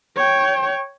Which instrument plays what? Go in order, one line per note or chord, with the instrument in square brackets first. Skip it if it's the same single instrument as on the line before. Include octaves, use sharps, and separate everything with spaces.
[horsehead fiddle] C#5 G5